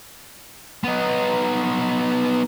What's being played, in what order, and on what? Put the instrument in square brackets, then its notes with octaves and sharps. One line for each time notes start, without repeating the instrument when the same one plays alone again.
[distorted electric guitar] B3 D#4